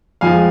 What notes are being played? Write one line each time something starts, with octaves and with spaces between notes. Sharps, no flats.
F2 F3 G#3 F5 G#5